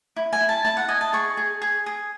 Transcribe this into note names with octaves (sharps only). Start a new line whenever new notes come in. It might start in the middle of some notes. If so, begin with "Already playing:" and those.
E4
G#5
E4
A5
E4 A5
F#5
D#5 G#5
A5
G#4 C#6
G#4
G#4
G#4